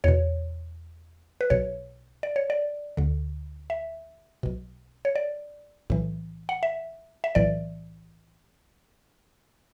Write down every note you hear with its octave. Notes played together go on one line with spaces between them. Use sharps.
E2 B2 C#5
B4
B1 B2 C#5
D5
C#5
D5
D2 D3
E5
B1 B2
C#5
D5
B1 A2 E3
F#5
E5
E5
B1 A2 E3 D5